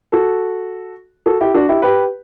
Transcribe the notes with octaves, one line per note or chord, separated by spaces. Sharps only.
F#4 A4
F#4 A4
E4 G4
D4 F#4
E4 G4
G4 B4